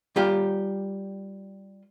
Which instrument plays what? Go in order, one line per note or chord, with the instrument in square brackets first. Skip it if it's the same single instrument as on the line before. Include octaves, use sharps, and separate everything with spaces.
[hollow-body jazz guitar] G3 F4 G4 G#5